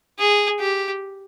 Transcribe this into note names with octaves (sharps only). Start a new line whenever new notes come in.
G#4
G4